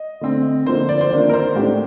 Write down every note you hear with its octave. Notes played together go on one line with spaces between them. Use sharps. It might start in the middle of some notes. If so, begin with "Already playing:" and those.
Already playing: D#5
D3 A3 C4
D3 F3 A#3 C5
D5
C5
D#3 A#3 D4 D5
A#4
C5
A2 A3 D4 G4